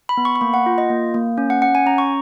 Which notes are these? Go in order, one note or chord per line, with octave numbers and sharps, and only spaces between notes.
B5
B3
C#6
C#6
A#3 B5
F#5
F4
D#5
A#3
A#3
C#4
F#5
C#4 F#5
G#5
C#4 A#5
C#6